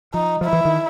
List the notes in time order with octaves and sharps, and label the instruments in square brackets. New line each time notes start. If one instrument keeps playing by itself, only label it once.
[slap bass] F3 [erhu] D#4
[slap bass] F3 [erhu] E4
[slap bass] E3
D#3